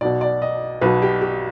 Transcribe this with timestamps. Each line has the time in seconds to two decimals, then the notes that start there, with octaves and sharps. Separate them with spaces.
0.01 B1 B2 D5
0.21 D5
0.42 D#5
0.81 B1 B2 B4
1.02 G4
1.22 G4